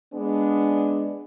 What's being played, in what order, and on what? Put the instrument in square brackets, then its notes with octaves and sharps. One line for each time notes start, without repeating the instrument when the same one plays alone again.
[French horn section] G#3 B3 D4